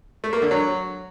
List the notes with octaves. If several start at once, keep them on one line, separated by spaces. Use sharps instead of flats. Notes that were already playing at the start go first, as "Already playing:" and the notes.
A3
A#3
D3
F#3